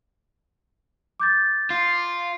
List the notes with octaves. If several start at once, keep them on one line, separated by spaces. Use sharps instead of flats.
D6 G6 A6
F4